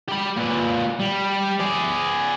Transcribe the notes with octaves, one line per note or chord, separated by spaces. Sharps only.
G4 B5
A#2 B4
G3
G#4 D5